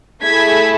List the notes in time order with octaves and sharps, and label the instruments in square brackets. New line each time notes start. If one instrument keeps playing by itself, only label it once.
[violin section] A3 E4 G#4 G#6 B6